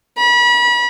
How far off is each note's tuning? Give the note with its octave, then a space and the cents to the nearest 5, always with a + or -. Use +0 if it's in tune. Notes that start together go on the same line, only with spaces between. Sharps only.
B5 -35